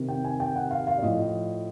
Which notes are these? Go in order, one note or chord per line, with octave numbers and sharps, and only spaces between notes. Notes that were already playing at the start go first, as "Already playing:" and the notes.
Already playing: C3 D#3
G5
G#5
G5
F#5
F5
F5
D5
A2 F3 D#5